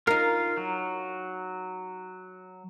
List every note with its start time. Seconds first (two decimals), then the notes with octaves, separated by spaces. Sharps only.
0.07 D#4 F4 A#4 F5
0.57 F#3